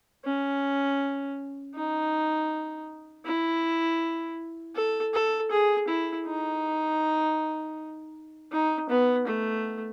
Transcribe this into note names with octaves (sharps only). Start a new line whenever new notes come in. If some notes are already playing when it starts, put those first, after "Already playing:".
C#4
D#4
E4
A4
A4
G#4
E4
D#4
D#4
B3
A3